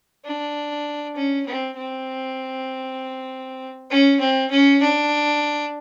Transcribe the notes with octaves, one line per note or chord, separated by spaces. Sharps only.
D4
C#4
C4
C4
C#4
C4
C#4
D4